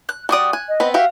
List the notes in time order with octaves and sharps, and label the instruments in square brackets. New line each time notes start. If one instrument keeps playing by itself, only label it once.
[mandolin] F#6
[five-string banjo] G3 D5 [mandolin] F#4 D6 D#6
[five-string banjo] G#5 [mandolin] F#6
[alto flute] D#5
[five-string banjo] B3 C4 [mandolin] B4
[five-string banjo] F#4 G4 E5 [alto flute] F5